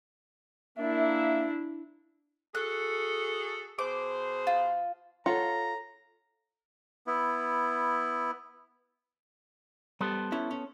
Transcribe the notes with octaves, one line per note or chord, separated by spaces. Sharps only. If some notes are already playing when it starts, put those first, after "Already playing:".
A#3 D4 E4 E5
F#4 G#4 A4 F#6
B2 G#4 C5 D6
F4
F4 A4 C#5 F#5 A#5
B3 E4
G3 B3 A4 C5
C#4 E4 E5
C#4